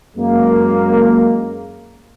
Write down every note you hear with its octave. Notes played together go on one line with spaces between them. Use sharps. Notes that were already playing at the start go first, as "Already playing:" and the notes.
F#2 G#3 A#3